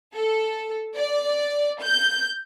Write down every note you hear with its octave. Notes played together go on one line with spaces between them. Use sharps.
A4
D5
G6